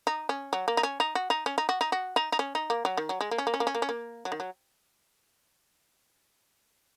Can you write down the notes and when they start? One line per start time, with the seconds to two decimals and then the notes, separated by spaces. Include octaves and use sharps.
0.07 D#4
0.29 C#4
0.53 F#3
0.68 A#3
0.77 D#4
0.83 C#4
1.00 D#4
1.15 F#4
1.30 D#4
1.46 C#4
1.58 D#4
1.69 F#4
1.81 D#4
1.92 F#4
2.16 D#4
2.32 D#4
2.39 C#4
2.55 D#4
2.70 A#3
2.85 F#3
2.97 D#3
3.09 F#3
3.21 G#3
3.31 A#3
3.38 C#4
3.47 A#3
3.54 C#4
3.60 A#3
3.67 C#4
3.75 A#3
3.82 C#4
3.89 A#3
4.25 F#3
4.32 D#3
4.40 F#3